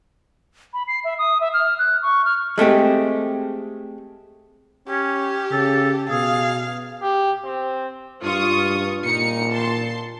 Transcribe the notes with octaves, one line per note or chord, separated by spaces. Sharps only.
B5
C7
E5
D#6
E5
F6
F#6
C#6
F6
G#3 A3 C4 G4
C#4 G4
C#3 A4
B2 G#4 F5
G4
C4
G2 F4 C#6 D#6
A#2 D#4 C#7
A5 C6